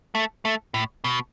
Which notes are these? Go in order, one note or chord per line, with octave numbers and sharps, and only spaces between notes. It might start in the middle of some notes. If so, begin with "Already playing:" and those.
A3
A3
A2
B2